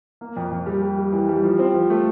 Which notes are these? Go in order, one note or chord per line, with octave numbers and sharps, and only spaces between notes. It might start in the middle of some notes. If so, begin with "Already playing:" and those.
A#3
F2
F2
G3
G3
G3
E3
G3
F3
C4
F3
A3